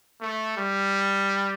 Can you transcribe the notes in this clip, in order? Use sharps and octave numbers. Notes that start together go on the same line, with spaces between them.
A3
G3